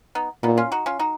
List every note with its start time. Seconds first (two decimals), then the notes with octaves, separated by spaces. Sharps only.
0.15 B3 D#4
0.43 A#2 B3 D#4
0.58 C#4 F4
0.72 D#4 F#4
0.86 C#4 F4
0.99 D#4 F#4